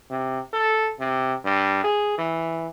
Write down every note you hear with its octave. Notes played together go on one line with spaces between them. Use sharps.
C3
A4
C3
G2
G#4
E3